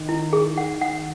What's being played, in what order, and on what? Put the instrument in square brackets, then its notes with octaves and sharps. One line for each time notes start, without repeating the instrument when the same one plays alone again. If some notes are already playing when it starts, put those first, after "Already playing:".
Already playing: [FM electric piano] D#3
[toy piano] E4
G#4
F#5
F#5